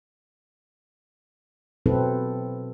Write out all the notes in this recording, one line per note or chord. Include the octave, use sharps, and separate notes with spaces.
B2 F#3 C4 E4 A4 B4